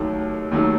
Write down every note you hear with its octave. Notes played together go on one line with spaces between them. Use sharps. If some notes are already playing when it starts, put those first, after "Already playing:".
Already playing: D#2 D#3 F#3 A3 D#4
D#2 D#3 F#3 A3 D#4